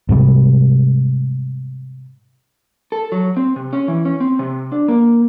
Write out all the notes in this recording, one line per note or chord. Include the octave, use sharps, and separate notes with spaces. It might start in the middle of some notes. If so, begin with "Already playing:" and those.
G#2 C3 G3
A4
F#3
C4
C3
C#4
E3
C#4
C4
C3
D4
A#3